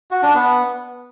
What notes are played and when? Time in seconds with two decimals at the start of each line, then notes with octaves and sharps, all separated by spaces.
0.11 F#4
0.23 D4
0.34 B3